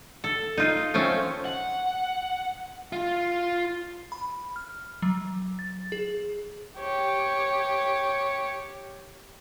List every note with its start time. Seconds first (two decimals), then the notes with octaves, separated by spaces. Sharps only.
0.24 A4
0.57 D#4 F4
0.94 F3 A3 C4 C#4
1.46 F#5
2.93 F4
4.12 B5
4.56 F6
5.02 F#3
5.59 A6
5.92 G#4
6.78 G4 C#5